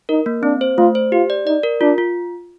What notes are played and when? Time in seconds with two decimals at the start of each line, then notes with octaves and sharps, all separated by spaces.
0.09 D#4 A#4
0.26 A#3
0.43 C4 D4
0.61 C5
0.77 A3 F4
0.95 C5
1.12 F4 G4
1.30 D5
1.46 D#4 D5
1.63 A#4
1.81 D4 F4
1.98 F4